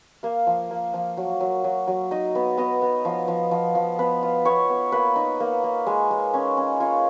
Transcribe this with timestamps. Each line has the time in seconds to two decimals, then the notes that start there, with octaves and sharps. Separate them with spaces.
0.23 A#3 F5
0.47 F3
0.71 A#3
0.94 F3
1.17 F#3
1.40 F#3
1.64 F#3
1.87 F#3
2.11 D#4 D#5
2.35 B3
2.57 B3 D#5
2.82 B3
3.05 F3
3.28 F3
3.51 F3
3.75 F3
3.99 B3 B4
4.23 F4
4.45 B3 C#5
4.69 B3
4.92 A#3 B4
5.16 D#4
5.40 A#3
5.64 A#3
5.86 G#3
6.11 G#3
6.34 C#4
6.57 C#4
6.80 F4 C#5